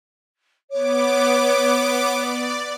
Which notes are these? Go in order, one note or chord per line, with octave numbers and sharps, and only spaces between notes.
B3 C#5 D6
D5